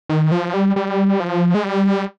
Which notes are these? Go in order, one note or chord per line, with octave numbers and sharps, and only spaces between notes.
D#3
F3
G3
G3
F3
G#3
G3